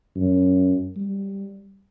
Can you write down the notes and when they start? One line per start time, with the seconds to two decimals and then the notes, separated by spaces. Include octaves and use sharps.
0.16 F#2
0.97 G3